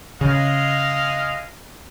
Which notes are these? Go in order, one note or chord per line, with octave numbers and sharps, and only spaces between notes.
C#3 G#3 D#5 F5